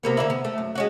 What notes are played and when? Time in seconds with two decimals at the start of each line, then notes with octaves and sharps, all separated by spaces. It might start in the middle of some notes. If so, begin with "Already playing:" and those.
0.03 C3 A#3 B3
0.17 D3 A#3 E4
0.30 B3
0.45 A3
0.58 F#2
0.75 G#3 C#4 F#4